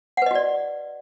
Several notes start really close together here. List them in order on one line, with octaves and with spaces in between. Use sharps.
F#5 B4 D#5 F#4 D5